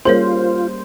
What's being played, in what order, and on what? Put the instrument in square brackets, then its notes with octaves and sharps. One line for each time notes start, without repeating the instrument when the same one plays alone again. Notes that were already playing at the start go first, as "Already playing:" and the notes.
[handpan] G3 A#3 C#4 [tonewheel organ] F4 [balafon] G#4 A#4 C#5 [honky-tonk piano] C5